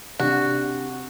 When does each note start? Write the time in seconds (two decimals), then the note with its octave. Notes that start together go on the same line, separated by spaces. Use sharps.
0.20 C3 D4 F#4